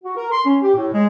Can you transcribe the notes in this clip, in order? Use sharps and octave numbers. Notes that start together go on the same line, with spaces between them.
F#4
A#4
C6
C#4
G4
A2
G#3